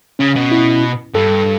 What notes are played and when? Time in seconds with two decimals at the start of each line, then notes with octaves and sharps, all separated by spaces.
0.19 C#3 C#4
0.35 B2
0.52 E4
1.14 G2 A4